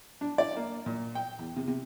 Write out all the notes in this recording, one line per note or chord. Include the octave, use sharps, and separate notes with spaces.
D4
D5
A#3
A#2
G5
E2
C3
C3